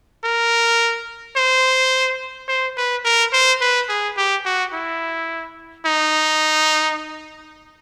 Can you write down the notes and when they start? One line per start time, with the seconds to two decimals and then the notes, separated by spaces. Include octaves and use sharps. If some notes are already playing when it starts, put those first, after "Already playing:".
0.24 A#4
1.36 C5
2.48 C5
2.77 B4
3.05 A#4
3.33 C5
3.61 B4
3.89 G#4
4.17 G4
4.45 F#4
4.73 E4
5.85 D#4